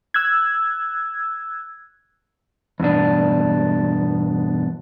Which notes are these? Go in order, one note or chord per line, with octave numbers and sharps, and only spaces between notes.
E6 F#6 G#6
E2 G2 B2 D4